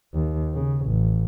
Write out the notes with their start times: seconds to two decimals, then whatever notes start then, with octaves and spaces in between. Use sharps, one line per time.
0.14 D#2
0.55 C#3
0.86 A1